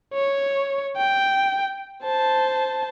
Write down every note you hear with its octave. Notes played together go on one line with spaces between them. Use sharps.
C#5
G5
C5 A5